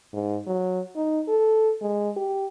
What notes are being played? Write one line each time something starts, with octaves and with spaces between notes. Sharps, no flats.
G#2
F#3
D#4
A4
G#3
G4